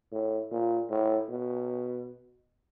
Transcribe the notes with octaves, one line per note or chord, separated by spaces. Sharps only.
A2
A#2
A2
B2